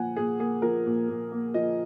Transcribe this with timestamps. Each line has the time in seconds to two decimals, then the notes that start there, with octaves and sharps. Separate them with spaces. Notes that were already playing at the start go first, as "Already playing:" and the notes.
Already playing: A#2 F3 F#5 G#5
0.16 A#2 G#4
0.39 A#3 G#4
0.62 F3 A#4
0.86 A#2
1.09 A#2
1.32 A#3
1.54 F3 D#5